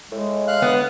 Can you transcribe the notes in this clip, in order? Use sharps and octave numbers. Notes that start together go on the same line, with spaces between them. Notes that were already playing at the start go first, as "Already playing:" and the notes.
A2 G#3
F5 F#6
B3